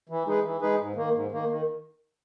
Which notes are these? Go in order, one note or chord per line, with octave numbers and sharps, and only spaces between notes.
E3
G#3 D#4 G#4 B4
E3
G#3 D#4 G#4 B4
G#2
D#3 A#3
G#2
D#3 A#3
D#3